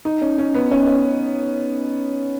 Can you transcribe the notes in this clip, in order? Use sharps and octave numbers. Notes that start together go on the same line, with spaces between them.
D#4
C#4
C#4
B3
C#4
C#4